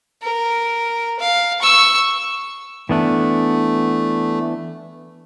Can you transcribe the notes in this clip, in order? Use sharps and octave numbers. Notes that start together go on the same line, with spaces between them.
A#4
F5
C#6 E6
E3 A3 B3 D4